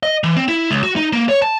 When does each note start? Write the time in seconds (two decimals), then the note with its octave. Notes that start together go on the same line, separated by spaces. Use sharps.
0.03 D#5
0.24 E3
0.36 C4
0.48 E4
0.71 C#2
0.83 F#4
0.96 D#4
1.13 A#3
1.29 C#5
1.42 A5